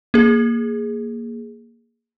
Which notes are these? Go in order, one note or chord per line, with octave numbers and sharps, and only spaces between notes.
A#3 G#4